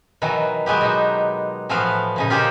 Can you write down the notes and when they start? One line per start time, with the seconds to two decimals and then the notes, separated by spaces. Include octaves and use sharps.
0.22 B2 D#3 E3 F#3
0.66 F#3 G#3 B3 G4
0.81 B2 D#4
1.69 A2 E3 F3 B3 F#4 F5
2.16 A#2 C#3 D#4
2.30 F4 G4 G#4 A#4 C5 D5